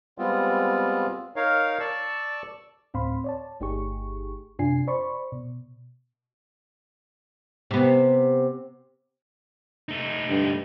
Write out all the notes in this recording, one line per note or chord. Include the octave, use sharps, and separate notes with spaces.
G3 G#3 B3 C4 F4
D#4 A#4 C#5 F5
D5 A5 C#6 E6
D2 A2 C4 F5 B5 C6
C#5 D5 A5
G1 A3 D#4 G4 G#4 C#6
F#2 C3 D4 F4 G#5 C7
C5 D5 B5 C#6
B2
C3 B3
A3 D#4
G2 D3